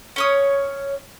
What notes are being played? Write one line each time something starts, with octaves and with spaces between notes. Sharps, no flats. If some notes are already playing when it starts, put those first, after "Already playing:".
C#4 C#5 D#6